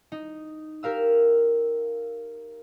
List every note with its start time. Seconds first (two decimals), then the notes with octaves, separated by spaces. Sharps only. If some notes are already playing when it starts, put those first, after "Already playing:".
0.12 D#4
0.83 G4 A#4 F5 E6